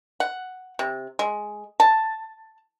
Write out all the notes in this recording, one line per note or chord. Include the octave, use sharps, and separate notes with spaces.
F#5
C3
G#3
A5